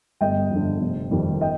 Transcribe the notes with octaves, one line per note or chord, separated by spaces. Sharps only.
G1 D#5 G5
F2 D3
F1
F2 D#3 G3
D#5 G5